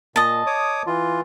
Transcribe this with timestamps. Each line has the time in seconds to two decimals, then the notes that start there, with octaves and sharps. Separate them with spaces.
0.16 A#2 D#5 A5
0.47 C#5 D6 D#6
0.87 E3 F4